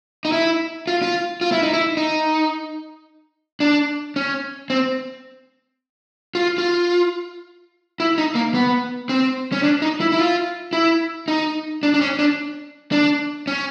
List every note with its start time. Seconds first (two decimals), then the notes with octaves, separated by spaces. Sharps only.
0.25 D#4
0.32 E4
0.87 F4
1.02 F4
1.41 F4
1.52 E4
1.63 D#4
1.73 E4
1.97 D#4
3.60 D4
4.16 C#4
4.70 C4
6.35 F4
6.58 F4
8.00 E4
8.18 D#4
8.35 A#3
8.54 B3
9.09 C4
9.52 C#4
9.63 D4
9.82 D#4
10.00 E4
10.12 E4
10.19 F4
10.73 E4
11.28 D#4
11.83 D4
11.94 D4
12.01 C#4
12.19 D4
12.92 D4
13.47 C#4